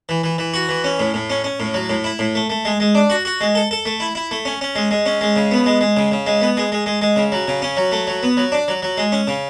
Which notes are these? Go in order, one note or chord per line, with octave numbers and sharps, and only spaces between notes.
E3
E3
E3
F#4
E3
C#4
A2
A2
C#4
C#4
A2
F#3
A2
E4
A2
A3
A3
G#3
G#3
D4
F#4
F#4
G#3
A4
A4
A3
E4
E4
A3
C#4
C#4
G#3
G#3
C#4
G#3
C#3
B3
G#3
G#3
C#3
C#3
G#3
B3
G#3
G#3
G#3
G#3
C#3
F#3
C#3
C#4
F#3
A3
F#3
B3
F#3
D4
F#3
F#3
G#3
C#4
C#3